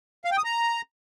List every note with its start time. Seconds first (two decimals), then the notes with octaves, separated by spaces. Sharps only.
0.25 F5
0.31 G5
0.38 D#6
0.44 A#5